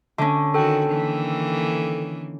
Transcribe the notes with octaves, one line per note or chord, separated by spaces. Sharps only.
D3 C#4
D#3 F#4 A4 G5
D#3 E3 A#3